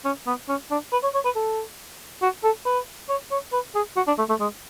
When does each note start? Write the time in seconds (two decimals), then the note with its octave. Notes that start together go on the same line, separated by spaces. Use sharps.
0.05 C#4
0.27 B3
0.49 C#4
0.71 D4
0.92 B4
1.03 C#5
1.14 C#5
1.25 B4
1.36 A4
2.22 F#4
2.44 A4
2.66 B4
3.09 C#5
3.31 C#5
3.52 B4
3.75 G#4
3.96 F#4
4.07 D4
4.18 A3
4.29 A3
4.40 G#3